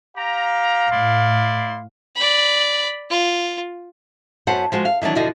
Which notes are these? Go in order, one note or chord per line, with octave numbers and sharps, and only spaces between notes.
G4 F5 A#5
A2 E4 D5 C6
D5 B5
F4
F#2 B3 F#4 C5 F#5 A5
F3 G#3 F#4
F5
D#3 E3 F#3 D4
E2 B2 D3 F3 F#4 D#5